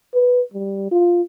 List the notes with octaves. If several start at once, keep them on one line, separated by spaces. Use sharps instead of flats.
B4
G3
F4